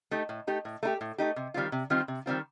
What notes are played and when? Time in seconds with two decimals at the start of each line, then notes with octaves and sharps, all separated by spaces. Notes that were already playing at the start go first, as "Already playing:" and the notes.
0.11 A3 D#4 G4
0.29 A2
0.47 A3 D#4 G4
0.65 A2
0.83 A3 D#4 G4
1.01 A2
1.18 A3 D#4 G4
1.36 C3
1.54 D#3 G3 C4 F4
1.72 C3
1.90 D#3 G3 C4 F4
2.08 C3
2.26 D#3 G3 C4 F4